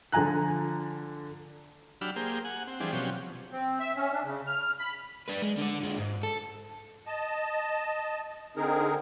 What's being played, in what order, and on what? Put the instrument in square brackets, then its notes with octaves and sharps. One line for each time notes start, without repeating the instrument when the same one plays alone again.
[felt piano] D3 F3 G#5 A#5 F#6
[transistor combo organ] F#3 D4 G4 B5 E6 F6
A#3 G4 G#4 C5
F#5 G#5
C4
E3 F3 G3 D4 G#4 C5
B2 F3 F#3 C4 C#4 G4
[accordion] C4
E5
C#4
D4
C#3
F6
B5
[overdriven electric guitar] D4 B4
G#3
D3 D5
D3 G#3
G#2
A4
[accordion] D#5 A5
D3 C4 D#4 G#4 A#4